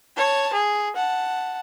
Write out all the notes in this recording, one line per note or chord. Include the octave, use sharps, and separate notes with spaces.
C#5 A5
G#4
F#5 A5